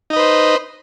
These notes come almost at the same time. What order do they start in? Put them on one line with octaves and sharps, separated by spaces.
D#4 D#5 B4 C5